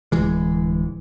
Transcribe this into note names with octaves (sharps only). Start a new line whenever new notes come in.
D1 E3 G#3